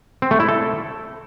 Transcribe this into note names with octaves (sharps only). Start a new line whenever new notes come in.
C4
A3
E4
A4